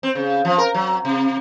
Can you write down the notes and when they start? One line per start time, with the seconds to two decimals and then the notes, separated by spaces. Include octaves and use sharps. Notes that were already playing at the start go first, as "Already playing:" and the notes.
0.03 C4
0.15 C#3
0.45 F3
0.58 A#4
0.74 F#3
1.05 C3